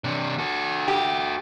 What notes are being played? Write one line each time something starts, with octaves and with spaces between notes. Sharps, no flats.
C3 D4
F#4 A4
G4